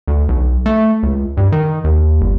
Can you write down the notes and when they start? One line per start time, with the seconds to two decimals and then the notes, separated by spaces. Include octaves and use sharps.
0.08 D2
0.28 B1
0.66 A3
1.03 C#2
1.37 G2
1.52 D#3
1.84 D#2
2.21 G1